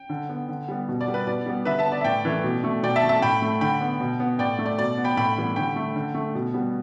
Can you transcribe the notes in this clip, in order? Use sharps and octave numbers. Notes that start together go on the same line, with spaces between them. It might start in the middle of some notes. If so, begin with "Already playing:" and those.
Already playing: G5
D3
B3
D3
G3 B3
B2
D5
G3 B3
B4
B2 D5
G3 B3
D3 B4 E5
E5 A5
B3
D5
E5
A2 D5 G5
E3 A3
B2
A3
B2 D5 G5
E5 A5
A3
E5 A5
A2 G5 B5
A3
D3 G5 B5
B3
B2
B3
A2 D5 G5
A3
D5
B2 D5
B3
G5 B5
A2 G5 B5
E3 G3 B3
D3 G5 B5
A3
D3
A3
B2
G3 B3